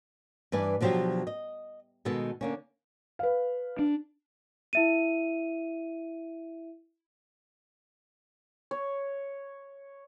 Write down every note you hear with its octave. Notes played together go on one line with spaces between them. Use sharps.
G2 E3 B4 D5 G#5
B2 D3 F3 F#3 G4
D#5
B2 D#3 G#3 B3 A4
D3 A#3 C#4
B4 F5
D4
E4 E5 D#7
C#5